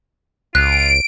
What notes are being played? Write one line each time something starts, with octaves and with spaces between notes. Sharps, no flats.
C#2 F4 F#6 D7